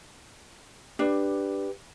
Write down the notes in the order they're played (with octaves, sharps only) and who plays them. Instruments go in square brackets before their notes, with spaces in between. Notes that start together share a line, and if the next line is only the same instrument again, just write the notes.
[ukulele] D4 [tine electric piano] G4 B4